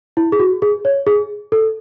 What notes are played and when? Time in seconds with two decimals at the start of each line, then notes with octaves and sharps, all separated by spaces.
0.17 E4
0.32 G#4
0.39 F#4
0.62 G#4
0.85 C#5
1.07 G#4
1.52 A4